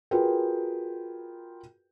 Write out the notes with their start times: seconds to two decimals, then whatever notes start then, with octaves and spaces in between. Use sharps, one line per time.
0.11 F4 F#4 G#4 A#4 B4 G5